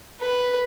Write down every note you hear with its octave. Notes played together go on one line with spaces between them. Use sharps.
B4